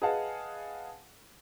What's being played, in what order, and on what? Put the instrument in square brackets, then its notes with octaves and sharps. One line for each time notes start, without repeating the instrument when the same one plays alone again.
[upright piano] G#4 B4 D#5 F5 F#5 A5